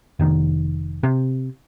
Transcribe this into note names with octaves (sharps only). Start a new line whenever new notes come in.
F1 D#3
C3